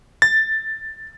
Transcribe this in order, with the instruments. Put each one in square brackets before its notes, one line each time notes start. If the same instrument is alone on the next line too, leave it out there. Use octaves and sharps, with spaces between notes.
[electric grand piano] A6